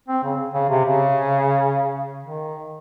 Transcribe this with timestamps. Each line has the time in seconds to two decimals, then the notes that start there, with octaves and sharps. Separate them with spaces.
0.08 C4
0.24 C#3
0.54 C#3
0.70 C3
0.85 C#3
2.23 D#3